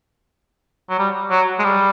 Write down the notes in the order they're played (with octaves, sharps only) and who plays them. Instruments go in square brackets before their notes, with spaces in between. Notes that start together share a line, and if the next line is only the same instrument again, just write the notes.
[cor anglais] F#3
G3
F#3
G#3
G3